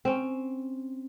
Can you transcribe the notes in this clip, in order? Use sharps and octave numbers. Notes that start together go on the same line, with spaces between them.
C4 C#4